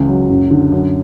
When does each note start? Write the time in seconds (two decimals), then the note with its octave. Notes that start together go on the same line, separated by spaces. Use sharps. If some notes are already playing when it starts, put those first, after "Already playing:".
Already playing: C#2 E3
0.08 F#3
0.29 F#1
0.51 D3
0.72 F#2